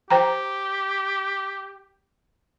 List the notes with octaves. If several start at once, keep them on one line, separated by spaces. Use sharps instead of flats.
G4 C5 G5 A#5